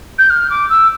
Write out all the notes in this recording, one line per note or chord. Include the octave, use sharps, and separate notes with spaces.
G6
F6
D6
E6